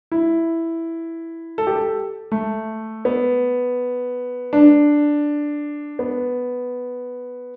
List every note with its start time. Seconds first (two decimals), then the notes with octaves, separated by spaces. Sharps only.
0.12 E4
1.58 A4
1.67 G4
1.76 A4
2.32 A3
3.05 B3
4.53 D4
5.99 B3